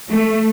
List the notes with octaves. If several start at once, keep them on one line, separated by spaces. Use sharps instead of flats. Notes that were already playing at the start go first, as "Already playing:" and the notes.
A3